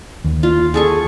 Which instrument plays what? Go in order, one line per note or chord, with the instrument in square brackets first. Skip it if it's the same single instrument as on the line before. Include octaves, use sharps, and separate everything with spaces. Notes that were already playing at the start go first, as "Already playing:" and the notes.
[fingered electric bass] D#2
[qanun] F4
G#4 A4 C#6